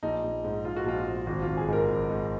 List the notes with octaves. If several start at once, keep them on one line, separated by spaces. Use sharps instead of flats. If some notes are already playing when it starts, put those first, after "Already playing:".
A#1 D#4
A#1
G#2
G#2 F4
F#4
A#1 F4
A#1
G#1 F#4
G#1 F4
G#4
G#2 A#4
G#1
G#2